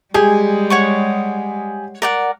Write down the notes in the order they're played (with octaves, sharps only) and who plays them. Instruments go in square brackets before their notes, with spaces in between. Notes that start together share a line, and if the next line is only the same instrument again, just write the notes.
[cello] G3 G#3 [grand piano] G4 G#4 [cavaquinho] G#5
[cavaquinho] C#5 F#5 C#6
A#4 D5 F#5